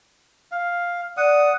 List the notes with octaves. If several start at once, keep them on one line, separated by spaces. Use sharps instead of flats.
F5
D5 F#5 D#6